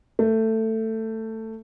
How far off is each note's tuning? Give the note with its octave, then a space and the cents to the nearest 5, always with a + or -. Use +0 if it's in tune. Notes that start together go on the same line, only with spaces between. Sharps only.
A3 +15